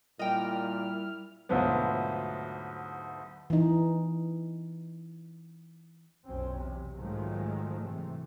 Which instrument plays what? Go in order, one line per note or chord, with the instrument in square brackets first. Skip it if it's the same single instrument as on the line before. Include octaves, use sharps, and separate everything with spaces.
[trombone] A#2 [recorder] G3 [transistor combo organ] E4 F6 [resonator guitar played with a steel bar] D#5 G5
[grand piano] D2 G#2 B2 F3 F#3 B3
[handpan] E3 D#4
[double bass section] B1 F2 C4 C#4
E2 C3
G#2 D#3 F3 F#3 G#3 A3
C3 E3 A3